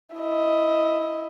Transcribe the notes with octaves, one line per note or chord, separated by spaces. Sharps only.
E4 D#5